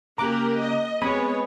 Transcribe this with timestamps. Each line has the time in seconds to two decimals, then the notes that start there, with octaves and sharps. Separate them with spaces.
0.18 C#3 A#3 G4 A#4 A#5 D6 F#6
0.60 D#5
1.02 G#3 B3 C4 G4 C#5 G#5 B5 D#6